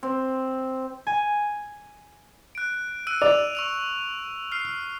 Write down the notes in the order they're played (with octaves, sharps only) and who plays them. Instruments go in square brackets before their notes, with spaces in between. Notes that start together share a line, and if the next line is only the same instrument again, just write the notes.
[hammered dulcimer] C4
[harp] G#5
[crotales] F#6 D7
E6 F#6 D#7
[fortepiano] D5 [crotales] F7
[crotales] C#6 E6 F7
F6 C7